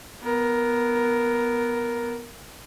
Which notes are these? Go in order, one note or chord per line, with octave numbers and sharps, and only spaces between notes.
B3 A#4